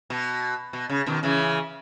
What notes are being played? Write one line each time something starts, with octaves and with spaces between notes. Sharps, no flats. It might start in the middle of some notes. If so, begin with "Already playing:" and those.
B2
B2
C#3
B2 D#3
C#3 E3